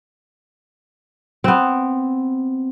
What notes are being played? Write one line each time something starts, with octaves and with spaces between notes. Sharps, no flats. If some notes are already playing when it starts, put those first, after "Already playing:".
B3 C4